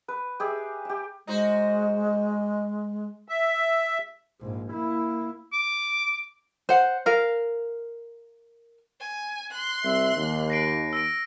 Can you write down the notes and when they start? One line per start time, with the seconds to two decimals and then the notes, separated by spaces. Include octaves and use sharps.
0.08 B4
0.40 G4 G#4 E5
0.85 G4 E5
1.27 G#3 D#4 F#4 C5
3.28 E5
4.40 A#1 G#2
4.71 A#3 E4
5.53 D6
6.69 C5 F#5
7.06 A#4 F5
9.00 G#5
9.51 C6 F#6
9.85 C2 E5
10.16 D#2
10.50 A#6 C7 D7
10.93 E6 A#6 D7